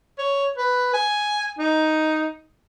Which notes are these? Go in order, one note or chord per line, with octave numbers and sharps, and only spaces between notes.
C#5
B4
G#5
D#4